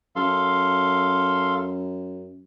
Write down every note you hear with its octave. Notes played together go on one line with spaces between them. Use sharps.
F#2 A4 F5 C6